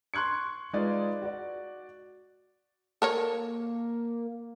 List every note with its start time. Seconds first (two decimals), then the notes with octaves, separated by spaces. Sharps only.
0.14 C6 C#6 F#6 G#6 C#7
0.73 G#3 D#4 F4 B4 D5
1.22 F#4 D5
3.02 A#3 A4 A#4 C#5